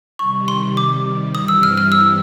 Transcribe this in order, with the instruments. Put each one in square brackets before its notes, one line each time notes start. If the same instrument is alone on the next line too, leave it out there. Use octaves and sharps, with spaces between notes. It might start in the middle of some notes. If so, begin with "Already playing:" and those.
[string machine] C3 D#3 G3 [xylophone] C#6
[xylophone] C6
D6
[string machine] G2 E3 G3 C4 E4 [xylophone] D#6
[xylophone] E6
F6
F6
E6